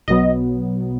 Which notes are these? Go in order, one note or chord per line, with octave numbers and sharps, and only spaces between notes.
B1 B2 F#3 B3 D#5